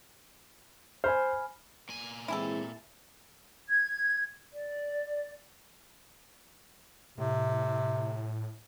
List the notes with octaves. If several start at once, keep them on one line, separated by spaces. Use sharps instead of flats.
C5 G#5 B5 F6
A#2 G#5
E3 G#3 C4 E4 G4 A4
G#6
D5
A2 C3